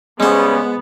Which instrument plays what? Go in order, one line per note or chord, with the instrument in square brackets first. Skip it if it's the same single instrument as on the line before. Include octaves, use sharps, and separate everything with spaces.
[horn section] C#3 G3 C#4 [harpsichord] G#3 C5 [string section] B3